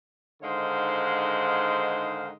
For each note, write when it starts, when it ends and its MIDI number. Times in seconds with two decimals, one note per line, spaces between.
0.42 2.31 44
0.42 2.31 50
0.42 2.31 51
0.42 2.31 56
0.42 2.31 72
0.42 2.31 77